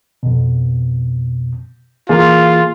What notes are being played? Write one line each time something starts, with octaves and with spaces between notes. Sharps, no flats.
F2 B2
E3 A#3 F4 G#4